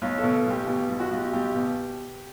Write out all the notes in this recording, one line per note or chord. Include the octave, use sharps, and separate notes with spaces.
B1 C#5
A4
B2
B1 G4
B2 G4
B1
F#4
B1
G4
B1 G4
B2